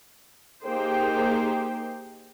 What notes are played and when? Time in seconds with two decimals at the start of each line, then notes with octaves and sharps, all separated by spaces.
0.65 A#3 D#4 G4 G#4 C5 G5